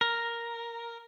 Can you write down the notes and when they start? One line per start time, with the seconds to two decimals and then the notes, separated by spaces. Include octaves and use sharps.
0.01 A#4